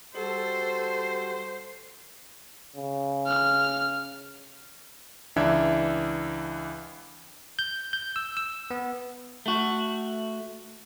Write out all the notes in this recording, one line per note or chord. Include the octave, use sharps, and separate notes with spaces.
G3 F#4 A4 C5
C#3
F6
C#2 E3 D4 E5 G#6
G6
G6
E6
E6
B3
A3 F#4